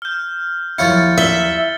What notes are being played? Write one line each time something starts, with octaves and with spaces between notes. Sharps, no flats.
F6 G6
D#2 F3 F#3 E4 F4 C#5 A6 C#7
E5 E6 G7